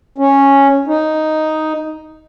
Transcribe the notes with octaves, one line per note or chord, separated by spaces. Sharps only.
C#4
D#4